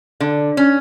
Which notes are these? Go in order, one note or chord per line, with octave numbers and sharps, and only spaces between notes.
D3
C#4